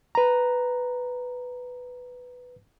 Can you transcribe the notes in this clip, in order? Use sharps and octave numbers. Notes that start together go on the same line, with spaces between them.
B4 A#5